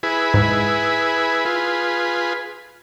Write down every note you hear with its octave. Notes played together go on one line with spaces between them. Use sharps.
E4 G#4 B4
G#2
F4 G#4 B4